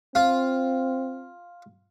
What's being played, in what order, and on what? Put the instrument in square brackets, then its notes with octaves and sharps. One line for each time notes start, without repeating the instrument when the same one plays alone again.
[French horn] C4 [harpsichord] F4